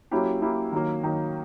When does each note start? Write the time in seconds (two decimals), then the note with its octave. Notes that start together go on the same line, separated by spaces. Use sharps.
0.11 F#3 A#3 C#4 E4 G4
0.42 F#3 A#3 C#4 E4 G4
0.72 D#3 F#3 A#3
1.03 D#3 F#3 A#3